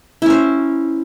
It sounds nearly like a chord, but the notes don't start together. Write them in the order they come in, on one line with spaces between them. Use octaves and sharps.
E4 C#4 C5